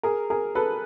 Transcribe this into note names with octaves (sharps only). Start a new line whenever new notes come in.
G#4 A#4
G#4 A#4
A4 B4